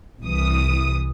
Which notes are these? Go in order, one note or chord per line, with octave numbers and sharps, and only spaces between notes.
C2 E3 D#6